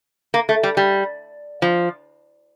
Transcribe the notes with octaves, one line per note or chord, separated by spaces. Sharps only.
A#3
A3
G3
G3
F3